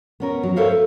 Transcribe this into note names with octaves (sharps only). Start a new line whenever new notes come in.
B3 C#4 A#4
F#3
A4 A#4 C5 C#5 E5 F5
B4